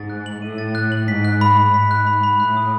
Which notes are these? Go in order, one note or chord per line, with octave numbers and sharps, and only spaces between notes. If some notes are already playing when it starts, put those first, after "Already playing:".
Already playing: G#2 A6
F#6
F#7
A2 D#7
A6
F#6
F#7
G#2 B6
F#6
B5
B5
G#2 B6
F#6
B5
B5
A2 F#6
D#6